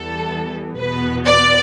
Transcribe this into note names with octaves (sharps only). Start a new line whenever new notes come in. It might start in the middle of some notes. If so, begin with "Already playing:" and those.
Already playing: E2 E3 G3 B3 A4
E2 B2 B3 B4
D5